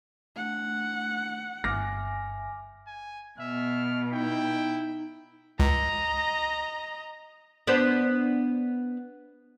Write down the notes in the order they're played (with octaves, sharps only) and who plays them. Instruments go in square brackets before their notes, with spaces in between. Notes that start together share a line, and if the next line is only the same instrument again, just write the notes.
[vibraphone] A3 D4 [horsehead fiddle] F#5
[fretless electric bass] G1 [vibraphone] E5 G#5 [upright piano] D6 F6 A#6
[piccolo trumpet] G#5
[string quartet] B2 [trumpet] E5 [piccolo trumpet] F6
[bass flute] D#4 [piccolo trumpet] E4 [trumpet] G5
[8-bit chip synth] C#2 [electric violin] D#5 A#5
[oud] B3 D4 C5